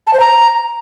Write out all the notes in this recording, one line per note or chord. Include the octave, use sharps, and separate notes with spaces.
A5
C5
A#5